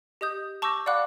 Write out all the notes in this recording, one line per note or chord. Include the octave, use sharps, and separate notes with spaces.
G4 D#5 D#6 G6
A5 C#6 D6 E6 G6 A#6
D5 F5 F#5 B5 D6 F#6